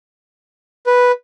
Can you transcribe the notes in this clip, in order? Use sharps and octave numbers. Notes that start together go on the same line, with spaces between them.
B4